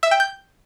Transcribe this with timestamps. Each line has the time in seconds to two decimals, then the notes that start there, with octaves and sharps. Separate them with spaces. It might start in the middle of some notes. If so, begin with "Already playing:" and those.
0.03 E5
0.11 G5
0.20 G6